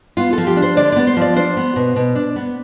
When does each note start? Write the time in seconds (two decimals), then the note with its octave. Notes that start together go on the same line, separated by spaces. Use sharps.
0.17 B3 F4
0.33 F3 A4
0.47 G4
0.57 D4
0.62 C5
0.76 D3 D5
0.92 B3 D5
1.07 C5
1.17 F3 D5
1.36 D4 C5
1.57 B3
1.76 B2
1.96 B2
2.15 D4
2.36 B3